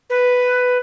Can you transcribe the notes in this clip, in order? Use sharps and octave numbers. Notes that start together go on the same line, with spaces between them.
B4